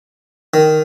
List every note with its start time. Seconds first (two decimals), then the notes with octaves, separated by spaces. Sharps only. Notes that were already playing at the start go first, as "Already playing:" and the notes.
0.54 D#3